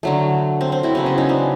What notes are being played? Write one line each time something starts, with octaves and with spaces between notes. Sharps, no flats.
D3 F#3 A3
C4
C4
E4 F#4
C#3 F#3 B3 C4
C#4
C#4 D#4
C4 D4